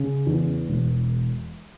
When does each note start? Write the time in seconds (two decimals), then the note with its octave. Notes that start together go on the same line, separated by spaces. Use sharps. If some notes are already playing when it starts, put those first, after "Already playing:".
Already playing: C#3
0.27 E2
0.68 E1